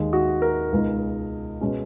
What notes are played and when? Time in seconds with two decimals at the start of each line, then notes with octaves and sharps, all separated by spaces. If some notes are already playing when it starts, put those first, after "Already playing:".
Already playing: D#2 D#3 G#3
0.13 F#4
0.42 A#4
0.72 C#2 B2 G#3 D#4
1.61 B2 G#3 C#4